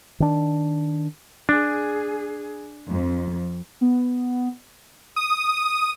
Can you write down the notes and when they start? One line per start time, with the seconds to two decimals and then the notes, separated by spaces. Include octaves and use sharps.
0.20 D#3 D4
1.49 D4 G#4
2.88 F2
3.81 B3
5.16 D#6